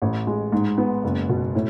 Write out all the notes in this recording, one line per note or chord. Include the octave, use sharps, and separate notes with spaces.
A1
G#3
G#2
B3
F#1
B2
A2